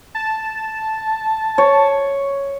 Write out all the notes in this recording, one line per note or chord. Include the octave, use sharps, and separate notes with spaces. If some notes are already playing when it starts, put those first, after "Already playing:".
A5
C#5